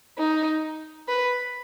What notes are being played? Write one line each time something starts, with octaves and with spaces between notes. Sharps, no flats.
D#4
B4